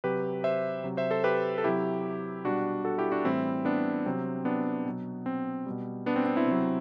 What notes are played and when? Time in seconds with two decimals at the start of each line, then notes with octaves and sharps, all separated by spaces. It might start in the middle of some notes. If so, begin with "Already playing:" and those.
0.04 C3 F#3 G4 B4
0.44 C5 E5
0.84 C3 F#3
0.97 C5 E5
1.11 A4 C5
1.24 G4 B4
1.58 A4
1.64 C3 F#3 E4 G4
2.45 B2 G3 D4 F#4
2.84 F#4 A4
2.98 E4 G4
3.12 D4 F#4
3.25 A2 E3 G3 C4 E4
3.65 B3 D4
4.06 C3 F#3 C4
4.45 B3 D4
4.85 B2 F#3
5.26 C4
5.66 B2 G3
6.06 B3 D4
6.16 C4
6.26 C4
6.37 C4 E4
6.47 C3 F#3